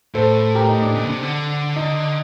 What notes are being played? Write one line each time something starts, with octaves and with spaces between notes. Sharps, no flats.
A2 A4 C5
G4 A#4
D#4
D4
A#2
D3
C3
D3
D#4